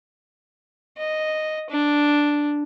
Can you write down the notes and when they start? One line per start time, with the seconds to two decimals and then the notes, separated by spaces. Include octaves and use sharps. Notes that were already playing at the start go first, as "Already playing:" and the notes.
0.97 D#5
1.70 D4